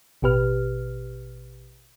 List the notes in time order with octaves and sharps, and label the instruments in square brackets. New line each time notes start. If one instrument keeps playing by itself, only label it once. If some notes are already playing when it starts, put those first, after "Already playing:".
[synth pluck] A1 B2 G4 B4 F6